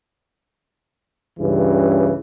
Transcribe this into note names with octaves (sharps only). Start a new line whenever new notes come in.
C#2 G2 C#3 E3